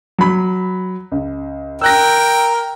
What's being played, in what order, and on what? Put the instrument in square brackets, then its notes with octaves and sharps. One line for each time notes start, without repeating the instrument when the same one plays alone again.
[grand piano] F#3 B5
C#2
[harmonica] A#4 G5 [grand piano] E6 F#6 A#6